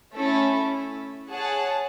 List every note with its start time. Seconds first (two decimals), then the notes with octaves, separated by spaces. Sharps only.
0.14 A3 C#4 E4 A4
1.31 G#4 C#5 F#5 A5